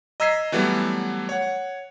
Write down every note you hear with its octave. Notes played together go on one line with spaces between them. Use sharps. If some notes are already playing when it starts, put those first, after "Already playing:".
D#5 A#5 E6 G#6 B6 C7
E3 F#3 G3 A3 B3 E4
C#5 F#5